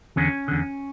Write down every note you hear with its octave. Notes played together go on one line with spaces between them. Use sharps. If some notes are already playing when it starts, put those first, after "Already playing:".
E2 D3 C#4
E2 D3